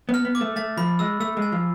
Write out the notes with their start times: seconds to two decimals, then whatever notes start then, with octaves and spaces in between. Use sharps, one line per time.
0.09 B3
0.14 F6
0.25 B3
0.35 D6
0.41 A3
0.56 A3 A6
0.77 F3 B5
0.99 G#3 E6
1.20 A3 E6
1.37 G#3
1.42 G#5
1.52 F3